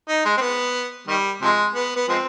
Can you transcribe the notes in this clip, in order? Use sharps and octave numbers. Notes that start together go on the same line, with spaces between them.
D#4
G#3
C4
B3
D#3 G3
C3 F3 G#3
B3
B3
F3 G#3 C4